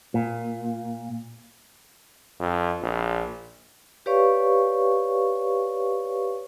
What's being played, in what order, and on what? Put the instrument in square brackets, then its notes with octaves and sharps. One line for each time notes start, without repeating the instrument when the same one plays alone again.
[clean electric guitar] A#2
[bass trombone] F2
A#1
[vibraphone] G4 B4 C#5 D5 F5 C#6